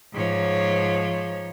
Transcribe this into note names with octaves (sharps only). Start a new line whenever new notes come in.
G#2 F3 C#5